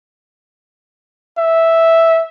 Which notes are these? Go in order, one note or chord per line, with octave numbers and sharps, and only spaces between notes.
E5